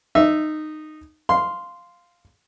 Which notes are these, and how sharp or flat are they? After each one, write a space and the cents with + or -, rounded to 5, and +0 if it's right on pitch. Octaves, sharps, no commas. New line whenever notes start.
D#4 -15 E5 +0
F5 +0 C6 -10